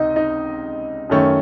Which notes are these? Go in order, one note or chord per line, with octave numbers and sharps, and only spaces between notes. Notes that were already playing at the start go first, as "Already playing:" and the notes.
Already playing: C#2 C3 D#4 D#5
D#4 D#5
F#2 D#3 A3 C#4